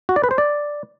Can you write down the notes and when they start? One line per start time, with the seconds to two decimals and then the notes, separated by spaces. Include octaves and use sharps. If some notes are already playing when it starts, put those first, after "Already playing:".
0.09 F#4
0.16 D5
0.24 B4
0.31 C5
0.38 D5